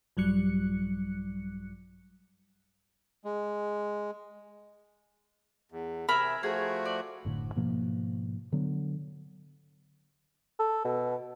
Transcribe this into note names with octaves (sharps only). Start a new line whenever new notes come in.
A#1 G2 F#3 G3 F#6 C#7
G#3
E2
C3 A#4 E5 G#5 B5
F3 A3 F#4 G#4 A#4
D5
F#1 A2 D3
G#2 B2 F3 A#3
D3 F#3 B3
A4
B2